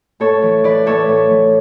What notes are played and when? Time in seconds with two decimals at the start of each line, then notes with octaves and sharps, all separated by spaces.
0.20 A2 A4 C#5
0.42 E3
0.64 E3 B4 D5
0.86 A2 A4 C#5
1.09 A2
1.30 E3